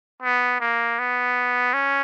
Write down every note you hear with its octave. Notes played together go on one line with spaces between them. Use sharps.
B3
A#3
B3
C#4